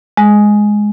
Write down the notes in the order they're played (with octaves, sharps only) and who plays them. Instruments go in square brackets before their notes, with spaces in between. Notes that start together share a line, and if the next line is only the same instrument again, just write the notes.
[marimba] G#3